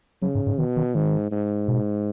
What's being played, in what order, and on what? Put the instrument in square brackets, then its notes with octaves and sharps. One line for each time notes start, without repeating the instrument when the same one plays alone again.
[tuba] C#3 [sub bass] F#3
[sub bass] G#2
G#2
[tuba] B2 [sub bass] D#3
[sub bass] D#3
[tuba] G#2 [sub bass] D#3
[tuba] G#2
[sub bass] B2